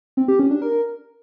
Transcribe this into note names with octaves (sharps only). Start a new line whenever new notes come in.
C4
G4
C#4
D4
A#4